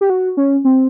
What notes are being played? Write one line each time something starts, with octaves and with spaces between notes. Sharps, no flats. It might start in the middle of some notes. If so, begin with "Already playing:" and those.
G4
F#4
C#4
C4